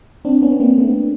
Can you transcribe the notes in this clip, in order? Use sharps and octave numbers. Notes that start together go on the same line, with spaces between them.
C4 D4
B3 C#4
A#3 C4
A3 B3